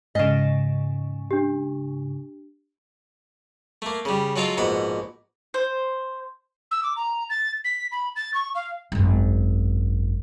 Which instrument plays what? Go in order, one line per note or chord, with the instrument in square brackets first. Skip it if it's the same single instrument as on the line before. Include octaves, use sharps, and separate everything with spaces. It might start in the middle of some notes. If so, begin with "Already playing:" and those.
[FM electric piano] G#2 C#3 [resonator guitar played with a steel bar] D#5 F5
[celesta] D4 G4
[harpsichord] A3 A#3
C#3 G3
F#3 G#3 F4 A4 F5
A#1 G#2 B2 F#5 B5
[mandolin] C5
[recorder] E6
D6
A#5
A6
B6
B5
A6
C#6
F5
[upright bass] G#1 F#2